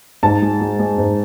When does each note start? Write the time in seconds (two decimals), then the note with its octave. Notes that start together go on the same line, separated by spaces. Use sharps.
0.23 G#2 A5
0.42 G#3
0.61 G#3
0.79 G#3
0.98 G#2